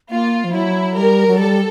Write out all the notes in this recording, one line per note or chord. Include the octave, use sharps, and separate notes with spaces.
A#3 F4
F3
F#3 E4
G3 A#4
F#3
G3 A4